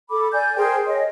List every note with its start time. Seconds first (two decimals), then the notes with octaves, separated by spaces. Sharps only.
0.09 A4 B5 D6
0.33 D5 G#5 G6
0.56 G#4 A#4 C5 G5
0.86 C#5 D#5